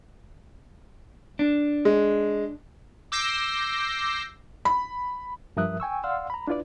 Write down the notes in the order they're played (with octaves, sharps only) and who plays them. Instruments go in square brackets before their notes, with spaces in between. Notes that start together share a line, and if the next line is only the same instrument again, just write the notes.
[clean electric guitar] D4
[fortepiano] G#3
[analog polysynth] D6 E6 G6 A#6 C7
[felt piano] B5
[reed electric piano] G2 F3 A#4 E5 D#6 F#6
G5 G#5 C#6 E6
D5 F5 F#5 C6 E6 F6
A#5 B5
D4 E4 F4 B4 D5